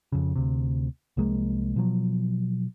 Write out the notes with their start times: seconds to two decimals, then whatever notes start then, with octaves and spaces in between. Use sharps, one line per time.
0.12 F2 C#3
0.36 D2 C3
1.17 C2 F3 G#3 A#3
1.76 B2 F3 F#3